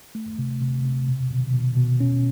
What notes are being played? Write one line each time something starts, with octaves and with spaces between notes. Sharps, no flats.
A3
C3
C3
C3
B2
B2
B2
B2
C#4